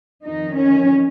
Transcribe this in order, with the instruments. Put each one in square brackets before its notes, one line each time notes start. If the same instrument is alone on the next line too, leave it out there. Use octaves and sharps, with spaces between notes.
[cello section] F2 D#3 D#4
C#4